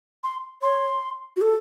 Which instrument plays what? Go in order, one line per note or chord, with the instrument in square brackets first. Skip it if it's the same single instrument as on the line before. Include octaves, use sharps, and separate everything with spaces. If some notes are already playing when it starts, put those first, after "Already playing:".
[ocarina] C6
[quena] C#5 [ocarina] C6
[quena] F#4
A4